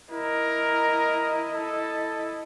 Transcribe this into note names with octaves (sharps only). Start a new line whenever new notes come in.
E4 A#4 D#5
A4